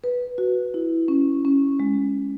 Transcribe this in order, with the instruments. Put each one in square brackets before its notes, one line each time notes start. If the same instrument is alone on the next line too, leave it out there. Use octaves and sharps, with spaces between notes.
[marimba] B4
F#4
E4
C#4
C#4
G#3